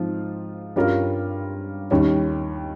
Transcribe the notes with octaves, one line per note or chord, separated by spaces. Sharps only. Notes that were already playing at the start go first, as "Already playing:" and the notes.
Already playing: G#2 F3 C4 F4
G2 G3 C#4 F4 A#4
D#2 D#3 G3 C#4